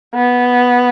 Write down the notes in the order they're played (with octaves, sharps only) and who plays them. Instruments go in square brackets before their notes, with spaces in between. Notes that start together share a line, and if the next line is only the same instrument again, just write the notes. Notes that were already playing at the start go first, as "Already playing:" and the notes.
[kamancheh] B3